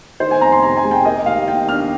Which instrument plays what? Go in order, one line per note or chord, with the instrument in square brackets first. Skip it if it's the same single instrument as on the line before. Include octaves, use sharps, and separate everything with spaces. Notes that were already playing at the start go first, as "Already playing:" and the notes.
[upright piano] D#3 C5
G#5
F2 A#5
C6
C3 A#5
G#5
G#3
G5
A#3 D#5
D#2 F5
D#3 G5
D4 F6